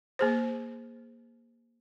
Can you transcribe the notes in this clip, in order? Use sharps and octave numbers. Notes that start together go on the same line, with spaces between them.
A#3 G#4 C5